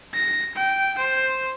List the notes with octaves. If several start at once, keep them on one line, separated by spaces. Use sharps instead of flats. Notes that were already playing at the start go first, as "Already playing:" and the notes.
A#6
G5
C5